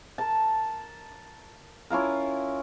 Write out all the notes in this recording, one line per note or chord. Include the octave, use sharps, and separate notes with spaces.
A#4 A5
C#4 E4 F4 A#4